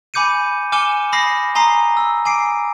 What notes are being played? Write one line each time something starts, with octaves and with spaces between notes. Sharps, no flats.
G#5 B5 D6 G6 C#7 D#7
G#5 D6 F6 C#7 E7 G7
B5 D#6 F6 A#6 C7
G#5 A#5 C6 D#6 C7
E6
G#5 D6 C7 D7